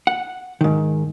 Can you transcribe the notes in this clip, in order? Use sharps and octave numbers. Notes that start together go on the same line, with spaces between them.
F#5
G#2 D#3